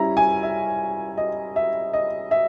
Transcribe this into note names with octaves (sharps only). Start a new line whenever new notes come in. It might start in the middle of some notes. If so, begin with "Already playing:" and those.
Already playing: G3 C#4 E4 A#5
G#5
E5
D#5
E5
D#5
E5